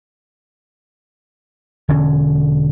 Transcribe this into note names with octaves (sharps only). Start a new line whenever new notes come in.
E1 D3 C#4